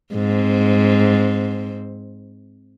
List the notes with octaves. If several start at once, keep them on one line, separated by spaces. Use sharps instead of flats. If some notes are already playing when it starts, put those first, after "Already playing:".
G#2 C4